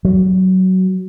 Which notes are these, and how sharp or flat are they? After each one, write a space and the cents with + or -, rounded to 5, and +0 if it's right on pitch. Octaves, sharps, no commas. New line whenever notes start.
F#3 +15